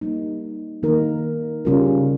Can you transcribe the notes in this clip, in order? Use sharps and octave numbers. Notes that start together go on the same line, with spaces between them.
G3 A#3 D#4
D#3 A#3 D#4 A#4
C#3 G3 C#4 F4 A#4